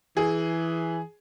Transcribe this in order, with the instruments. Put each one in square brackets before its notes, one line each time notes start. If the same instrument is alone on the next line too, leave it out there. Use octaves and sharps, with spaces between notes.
[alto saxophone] E3 [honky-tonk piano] G#4